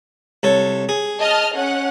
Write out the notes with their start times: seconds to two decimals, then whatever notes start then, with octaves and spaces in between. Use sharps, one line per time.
0.43 C2 A4 C#5
0.89 G#4
1.19 D#5 A5 F6
1.56 C#4 F#5